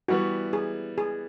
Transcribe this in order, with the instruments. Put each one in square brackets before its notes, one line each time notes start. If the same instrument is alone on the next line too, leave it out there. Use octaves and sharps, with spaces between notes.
[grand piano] E3 G3 B3 [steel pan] F#4
[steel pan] G#4
G#4